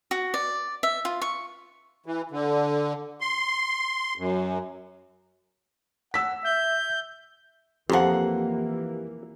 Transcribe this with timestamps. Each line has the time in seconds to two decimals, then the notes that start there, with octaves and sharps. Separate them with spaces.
0.11 F#4
0.34 D5
0.83 E5
1.05 F4
1.22 C#6
2.06 E3
2.31 D3
3.21 C6
4.18 F#2
6.14 F#5 E6 B6
6.44 E5 G6
7.90 F2 E3 F3 A#3 G4 F#5 A#5 C6